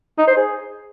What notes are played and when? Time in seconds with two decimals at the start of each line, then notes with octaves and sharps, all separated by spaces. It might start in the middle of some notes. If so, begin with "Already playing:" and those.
0.18 D#4
0.28 C5
0.37 G#4